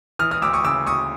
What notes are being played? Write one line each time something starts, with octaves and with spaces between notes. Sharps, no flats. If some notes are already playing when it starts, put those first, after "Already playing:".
E3 D#6 F6
D#6 F6
D2 D6 E6
C#6 D#6
C#3 D6 E6
D2 C#6 D#6